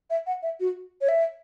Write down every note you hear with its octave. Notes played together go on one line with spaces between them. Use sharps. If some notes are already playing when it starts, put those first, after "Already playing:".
E5
F#5
E5
F#4
C#5
E5